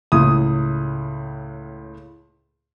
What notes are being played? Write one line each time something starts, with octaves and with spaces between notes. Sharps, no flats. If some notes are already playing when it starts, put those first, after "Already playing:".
C#2 A2 D#6